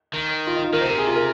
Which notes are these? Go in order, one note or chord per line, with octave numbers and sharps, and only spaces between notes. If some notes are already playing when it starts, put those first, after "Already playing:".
D#3
F4
D#4
F4
D#3 A#4
C3 C5
A#4
G#4
F4
A#4